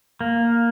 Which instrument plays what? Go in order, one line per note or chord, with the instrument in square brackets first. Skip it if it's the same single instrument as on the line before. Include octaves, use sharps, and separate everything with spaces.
[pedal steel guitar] A#3